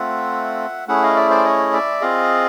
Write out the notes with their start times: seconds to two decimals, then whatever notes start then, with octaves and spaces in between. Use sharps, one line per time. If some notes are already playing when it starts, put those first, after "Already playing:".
Already playing: A3 C4 F4 E5 F#5
0.88 A3 C#4 E4 G#4 E5 F#5
1.03 D#5 F5
1.16 D5 E5
1.30 C5 D5
1.45 C#5 D#5
1.73 D5 E5
2.01 C4 F4 G#4 D#5 F5